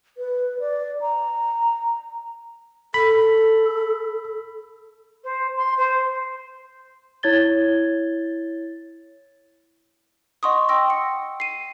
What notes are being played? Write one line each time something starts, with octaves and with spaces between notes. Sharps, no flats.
B4
D5
A#5
A4 B5
C5
C6
C5
E4 C#5 G#6 A6 G7
D#5 F#5 C6 C#6 D#6
G5 C6 E6 A#6
C#7
C7 D#7